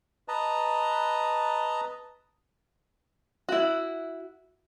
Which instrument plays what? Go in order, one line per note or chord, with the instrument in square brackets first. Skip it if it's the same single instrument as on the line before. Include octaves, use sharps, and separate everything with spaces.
[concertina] B4 D#5 A5 A#5
[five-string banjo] E4 F#4